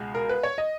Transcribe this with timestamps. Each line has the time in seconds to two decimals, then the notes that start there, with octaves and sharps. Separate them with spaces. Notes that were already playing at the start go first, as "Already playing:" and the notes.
Already playing: C#2 B2 G#3
0.15 A#4
0.29 B4
0.43 C#5
0.58 D#5